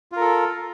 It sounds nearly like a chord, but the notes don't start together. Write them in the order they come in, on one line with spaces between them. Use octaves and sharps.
F4 A#4 A4